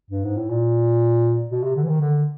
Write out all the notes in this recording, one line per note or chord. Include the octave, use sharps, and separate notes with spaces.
G2
G#2
A2
A#2
B2
C3
D3
E3
D#3
D3